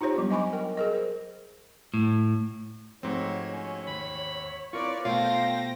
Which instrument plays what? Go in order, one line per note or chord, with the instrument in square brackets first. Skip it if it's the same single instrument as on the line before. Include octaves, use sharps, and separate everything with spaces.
[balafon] D#4 F4 G4 C5 C#5
F#3 G3 B3 D4
D#5 G#5 B5 C#6 D6
A#4 D#5 G5
G#4 A#4 D#5
C5
[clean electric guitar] A2
[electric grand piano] G#2 C4 [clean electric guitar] F3 A3 F#4 [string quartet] C#5
[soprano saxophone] C#4 [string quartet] C#5
[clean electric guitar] D#2 [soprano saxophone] B5
[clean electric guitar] C4 E4 [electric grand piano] F4 A#4 [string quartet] B4 C#5 D5 [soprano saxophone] C#6
[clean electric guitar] B2 [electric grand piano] A3 F4 [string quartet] C5 G5 A#6 [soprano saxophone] F5